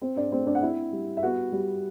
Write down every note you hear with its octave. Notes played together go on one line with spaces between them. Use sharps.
C4 C5
D4 D5
A3 C4 C5
D4 D5
F#5
C4 E4 E5
G3
E5
B3 F#4 F#5
G3